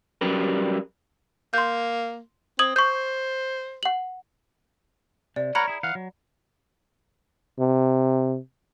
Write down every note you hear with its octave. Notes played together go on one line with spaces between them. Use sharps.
F#3 G3 C#4 G4 A#4 B4
A#3 C6 G6
C4 D#6 G#6 F#7
C5 C#6 G6
F#5 F#7
C3 D5
A#4 C#5 F#5 A#5 B5
E4 G#4
E3 F5 F#5
F#3
C3